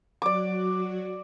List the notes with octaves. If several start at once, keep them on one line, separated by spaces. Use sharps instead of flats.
F#3 F#4 D5 D6